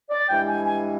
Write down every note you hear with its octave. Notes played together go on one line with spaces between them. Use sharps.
D5
G2 E3 G#3 G5
G#5
G#5